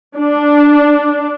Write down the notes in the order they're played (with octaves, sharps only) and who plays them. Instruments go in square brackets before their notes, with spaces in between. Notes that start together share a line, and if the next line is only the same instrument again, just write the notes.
[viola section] D4